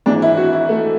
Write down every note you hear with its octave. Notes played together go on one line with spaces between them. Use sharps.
G#1 G#2 E3 D4
E4
F#4
E4
A3